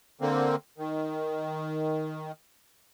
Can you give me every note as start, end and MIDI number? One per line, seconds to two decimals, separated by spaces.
0.21 0.56 50
0.21 0.56 58
0.21 0.56 60
0.78 2.32 51